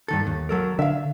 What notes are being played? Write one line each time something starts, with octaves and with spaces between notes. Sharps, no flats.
G2 D#3 A4
D#2
F#3 A4 A#4
D3 E5 F5